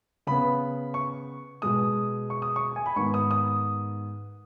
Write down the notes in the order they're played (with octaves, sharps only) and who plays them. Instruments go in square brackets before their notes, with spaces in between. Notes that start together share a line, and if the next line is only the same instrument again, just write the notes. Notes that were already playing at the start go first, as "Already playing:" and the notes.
[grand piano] C#3 B3 B5
C#6
B2 G#3 B3 D#6
C#6
D#6
C#6
G#5
B5
G#2 D#3 B3 C#6
D#6
D#6